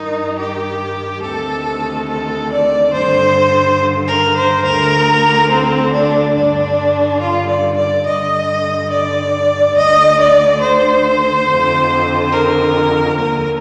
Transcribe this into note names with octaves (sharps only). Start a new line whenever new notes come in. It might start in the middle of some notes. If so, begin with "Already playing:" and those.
Already playing: G2 D#3 D#4
G4
D2 C3 D#3 A4
A4
D5
G2 D3 C5
A#4
C5
D2 D3 A#4
C4
D4
G2 D3 D4
F4
D5
D5
G2 D3 D#5
D5
D2 D3 D#5
D5
C5
F2 D3
A#4
D#2 D3 A#4